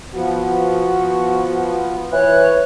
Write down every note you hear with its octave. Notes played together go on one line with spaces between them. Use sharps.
F3 B3 F#4
E3 C#5 F#6